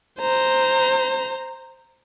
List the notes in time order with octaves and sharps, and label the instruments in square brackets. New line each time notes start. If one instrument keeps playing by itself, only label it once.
[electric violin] C5 A#5